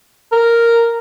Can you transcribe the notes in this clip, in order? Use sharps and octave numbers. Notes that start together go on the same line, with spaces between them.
A#4